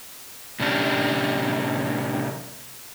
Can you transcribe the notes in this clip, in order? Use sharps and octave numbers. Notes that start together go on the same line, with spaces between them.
A2 C3 C#4 D4 G4